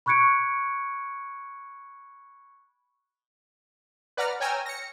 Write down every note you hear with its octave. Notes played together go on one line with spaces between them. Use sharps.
B5 C#6 F#6 G#6 C#7 D7
B4 D5 F#5 A#5 F6
C#5 G5 G#5 A#5 E6 F6
A#6 C#7